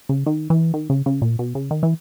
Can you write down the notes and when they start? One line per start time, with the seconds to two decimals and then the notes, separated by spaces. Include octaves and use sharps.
0.09 C#3
0.26 D#3
0.50 E3
0.74 D#3
0.90 C#3
1.06 C#3
1.22 A#2
1.39 B2
1.55 C#3
1.71 D#3
1.83 E3